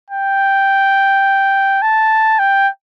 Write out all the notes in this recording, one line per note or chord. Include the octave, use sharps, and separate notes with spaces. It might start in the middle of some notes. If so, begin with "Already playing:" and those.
G5
A5
G5